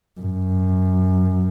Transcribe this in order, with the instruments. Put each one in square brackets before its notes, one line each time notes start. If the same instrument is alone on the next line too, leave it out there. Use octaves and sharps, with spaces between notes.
[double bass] F#2